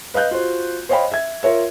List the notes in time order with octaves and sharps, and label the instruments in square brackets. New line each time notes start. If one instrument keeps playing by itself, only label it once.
[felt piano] B4 D#5 F5 F#6 G6
F4 F#4 C5
C5 C#5 D#5 F5 G5 B5
E5 G#6
F4 A#4 C#5 E5